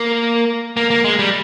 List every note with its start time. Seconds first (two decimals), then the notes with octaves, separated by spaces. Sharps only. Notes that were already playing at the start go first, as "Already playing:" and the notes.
Already playing: A#3
0.77 A#3
0.90 A#3
1.04 G#3
1.19 G3